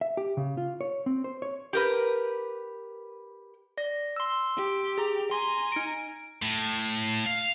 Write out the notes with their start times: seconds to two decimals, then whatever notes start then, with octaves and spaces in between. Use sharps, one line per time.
0.01 E5
0.17 G4
0.37 C#3
0.57 F4
0.81 C#5
1.06 C4
1.24 C5
1.42 C#5
1.73 G4 A#4 B4
3.77 D5 A#6
4.16 C6 E6
4.57 G4
4.98 G#4 A#5
5.31 G#5 A#5 C6
5.72 D#4 D7
6.42 A2
7.27 F5